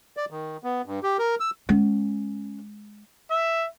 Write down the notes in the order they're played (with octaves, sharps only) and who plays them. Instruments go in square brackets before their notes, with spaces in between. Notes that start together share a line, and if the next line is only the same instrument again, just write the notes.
[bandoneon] D5
D#3
B3
G2
G4
A#4
E6
[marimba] G#3 [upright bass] C#4
[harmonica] E5